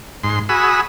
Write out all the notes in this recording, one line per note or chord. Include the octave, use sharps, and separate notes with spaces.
G#2 C6
F#4 G#4 B5 D#6 E6